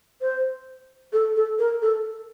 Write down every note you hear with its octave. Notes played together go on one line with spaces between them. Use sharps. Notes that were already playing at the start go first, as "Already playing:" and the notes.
C5
A4
A4
A#4
A4